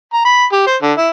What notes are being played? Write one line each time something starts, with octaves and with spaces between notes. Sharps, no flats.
A#5
B5
G4
C5
D3
E4